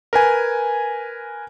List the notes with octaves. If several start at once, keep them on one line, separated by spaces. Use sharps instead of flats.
A#4 B4 G#5